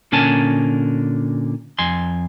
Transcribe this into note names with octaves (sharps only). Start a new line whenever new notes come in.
A#2 D3 C#4 A#4 G#5 A5
F2 G#5 C6